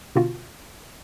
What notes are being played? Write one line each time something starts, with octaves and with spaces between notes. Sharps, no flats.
B2 D3 F4 F#4